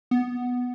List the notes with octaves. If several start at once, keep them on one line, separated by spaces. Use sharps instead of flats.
B3